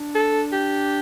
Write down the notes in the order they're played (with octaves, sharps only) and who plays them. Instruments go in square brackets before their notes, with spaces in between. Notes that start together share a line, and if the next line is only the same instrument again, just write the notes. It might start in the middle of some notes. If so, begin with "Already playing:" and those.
Already playing: [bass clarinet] D4
[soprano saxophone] A4
G4